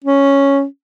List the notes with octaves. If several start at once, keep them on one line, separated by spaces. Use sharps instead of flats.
C#4